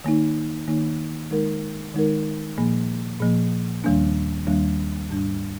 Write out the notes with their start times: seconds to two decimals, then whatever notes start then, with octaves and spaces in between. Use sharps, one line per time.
0.04 D#3 A#3 D#4
0.68 D#3 A#3 D#4
1.31 D#3 G#3 D#4 A#4
1.94 D#3 G#3 D#4 A#4
2.57 A#2 F3 A#3
3.20 A#2 F3 A#3
3.84 D#2 D#3 G3 A#3 D4
4.47 D#2 D#3 G3 A#3 D4
5.10 G#2 G3 D4